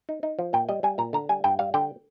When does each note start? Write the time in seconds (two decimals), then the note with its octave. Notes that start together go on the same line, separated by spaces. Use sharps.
0.09 D#4
0.23 D#4
0.39 F3
0.53 A#2 G5
0.69 G3 D#5
0.83 G3 G#5
0.98 A#2 A#5
1.13 D3 A#5
1.29 G3 G#5
1.44 G2 G5
1.59 G3 F5
1.74 D3 G5